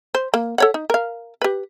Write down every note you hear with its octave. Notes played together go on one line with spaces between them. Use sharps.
C5
A#3
A4 C#5 F#5
D#4
A#4 F5
G4 B4